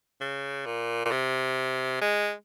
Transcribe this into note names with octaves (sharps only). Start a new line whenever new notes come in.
C#3
A#2
A#2
C3
G#3